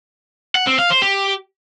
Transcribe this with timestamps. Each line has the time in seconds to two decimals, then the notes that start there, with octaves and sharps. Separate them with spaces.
0.55 F#5
0.67 C4
0.79 F5
0.90 C5
1.02 G4